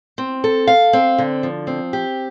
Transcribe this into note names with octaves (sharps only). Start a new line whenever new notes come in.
C4
A4
F5
C4
D3
F3
C4
G4